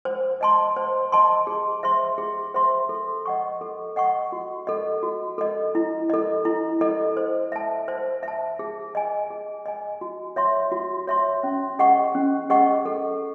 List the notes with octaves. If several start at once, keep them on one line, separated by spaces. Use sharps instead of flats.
C5
D#5 A5 C6
C5
D#5 A5 C6
G#4
C5 E5 C6
G#4
C5 E5 C6
A4
D#5 F#5 C#6
A4
D#5 F#5 C#6
F#4
A4 D#5
F#4
A4 D#5
E4
A4 D#5
E4
A4 D#5
C5
E5 A5
C5
E5
A5
G#4
D#5 G#5
G#4
D#5 G#5
F#4
C#5 E5 C6
F#4
C#5 E5 C6
C#4
G#4 D#5 F#5 C#6
C#4
G#4 D#5 F#5 C#6
A4